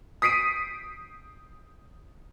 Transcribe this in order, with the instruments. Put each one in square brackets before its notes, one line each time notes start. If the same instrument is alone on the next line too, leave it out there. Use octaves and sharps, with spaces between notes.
[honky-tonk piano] D#6 B6 C7 D7 D#7